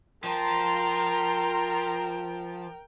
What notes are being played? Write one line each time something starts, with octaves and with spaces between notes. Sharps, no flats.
F3 A#4 G5 A#5 C6